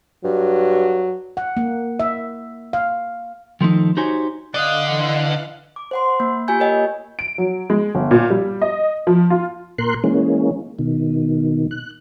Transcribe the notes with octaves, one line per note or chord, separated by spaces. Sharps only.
G2 F#3
F#5
A#3
E5
F5
D#3 F3 A3 D#4
D#4 F#4 G4 C5 C#5 G#5
D3 D5 D#5 F5 F#6
E3 D#5 F5 F#5 F#6
D6
C5 F#5 C6
A#3
A#3 F4 G4 G#5 G6
A#4 C#5 D#5 G5
D7
F#3
G#3
G1
A#2
G3
D#5
F3
F4
A#2 A#4 C6 F#6
E3 G#3 A#3 C#4
B2 D#3
F#6